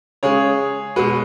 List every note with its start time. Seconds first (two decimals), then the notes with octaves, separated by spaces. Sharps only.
0.23 C#3 G#3 G#4 C#5
0.96 B2 G#3 F#4 B4